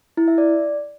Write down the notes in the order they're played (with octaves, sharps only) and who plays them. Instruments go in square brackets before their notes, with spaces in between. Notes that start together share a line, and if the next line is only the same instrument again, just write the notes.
[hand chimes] E4
E5
D5